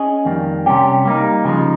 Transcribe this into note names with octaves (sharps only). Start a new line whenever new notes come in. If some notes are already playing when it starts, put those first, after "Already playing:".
Already playing: C#4 G#4 D#5
F2 D#3 G3 A#3
C3 G3 C#4 G4
G3 A#3 D#4
C#3 F3 G#3 D#4